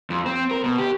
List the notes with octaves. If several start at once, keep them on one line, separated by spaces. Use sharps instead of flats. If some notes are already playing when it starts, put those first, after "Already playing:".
F2
C4
A#4
B2
G4